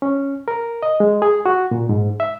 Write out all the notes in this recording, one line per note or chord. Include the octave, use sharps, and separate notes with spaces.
C#4
A#4
D#5
G#3
G#4
F#4
A#2
G#2
E5